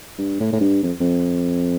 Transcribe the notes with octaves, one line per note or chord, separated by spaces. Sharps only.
G2
A2
A2
G2
F2
F2